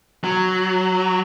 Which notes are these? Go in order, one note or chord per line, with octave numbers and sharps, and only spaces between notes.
F#3